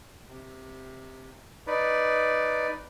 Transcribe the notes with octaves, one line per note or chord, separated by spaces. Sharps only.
C3
D#4 B4 D5